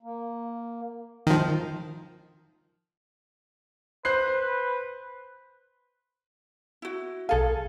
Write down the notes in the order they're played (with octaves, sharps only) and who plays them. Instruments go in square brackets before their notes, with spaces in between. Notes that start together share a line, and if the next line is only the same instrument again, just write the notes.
[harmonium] A#3
[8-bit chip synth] D#3 F3
[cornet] B4 [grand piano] C5 F#6 C7
[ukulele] E4 F#4
[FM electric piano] B1 F5 [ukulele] G#4 A4